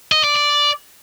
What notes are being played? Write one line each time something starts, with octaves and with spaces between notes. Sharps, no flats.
D#5
D5
D5